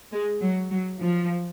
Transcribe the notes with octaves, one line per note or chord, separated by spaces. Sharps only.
G#3
F#3
F#3
F3